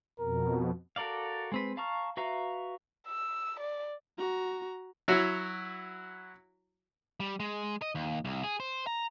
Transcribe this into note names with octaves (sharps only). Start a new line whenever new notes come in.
F2 B2 A#4
F#4 A4 A#4 D5 F5
G#3 C4 B4
F5 A5 A#5 C#6 F6
F#4 B4 E5 F5 A#5
E6
D5
F#4 A#5
F#3 E4 F#4 C#5
G3
G#3
D#5
D#2
C2
G#4
C5
A#5